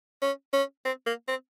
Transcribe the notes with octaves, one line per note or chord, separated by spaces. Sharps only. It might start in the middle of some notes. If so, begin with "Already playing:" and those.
C#4
C#4
C4
A#3
C4